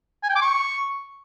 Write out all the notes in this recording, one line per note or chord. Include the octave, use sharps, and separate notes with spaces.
G#5
G5
D6
C#6